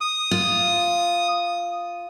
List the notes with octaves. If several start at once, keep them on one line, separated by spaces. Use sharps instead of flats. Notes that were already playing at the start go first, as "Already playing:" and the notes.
D#6
F4